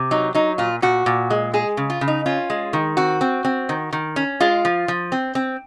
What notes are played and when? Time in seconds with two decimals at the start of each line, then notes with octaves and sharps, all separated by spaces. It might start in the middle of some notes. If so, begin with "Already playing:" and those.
Already playing: C3
0.11 F#3 D#4
0.34 F#3 D#4
0.58 A#2 F4
0.82 A#2 F#4
1.06 A#2
1.30 G#3
1.54 G#3 G#4
1.77 C#3
1.90 F4
2.01 C#3
2.08 D#4
2.26 C#4 F4
2.50 G#3
2.73 D#3
2.97 C4 F#4
3.21 C4
3.45 C4
3.69 D#3
3.93 D#3
4.16 C#4
4.40 G#3 F4
4.65 F3
4.88 F3
5.12 C4
5.35 C4